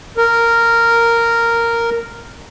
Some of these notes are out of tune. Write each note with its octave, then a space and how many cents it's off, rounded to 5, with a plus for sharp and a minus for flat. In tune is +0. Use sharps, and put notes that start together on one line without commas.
A#4 -10